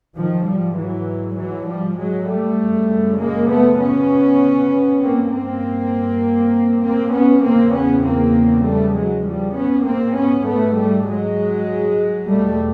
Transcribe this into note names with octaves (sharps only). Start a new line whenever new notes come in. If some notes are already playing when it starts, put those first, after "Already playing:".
G#2 D#3 F3
F3 G3
E3 F#3
E3 F#3
F3 G3
F#3 G#3
G3 A3
F#2 C#3
G#3 A#3
A3 B3
B3 C#4
G2 A#3 C4
A#3 C4
A#3 C4
B3 C#4
E2 C#3 A#3 C4
B3 C#4
A#3 C4
G3 A3
F#3 G#3
F3 G3
B3 C#4
G#2 A#3 C4
B3 C#4
A3 B3
G3 A3
F#3 G#3
E2 B2 G3 A3